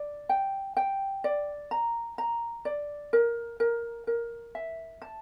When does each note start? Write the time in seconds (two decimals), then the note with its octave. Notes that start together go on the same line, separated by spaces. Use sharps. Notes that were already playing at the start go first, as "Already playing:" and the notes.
Already playing: D5
0.29 G5
0.77 G5
1.24 D5
1.71 A#5
2.18 A#5
2.65 D5
3.13 A#4
3.60 A#4
4.07 A#4
4.55 E5
5.02 A5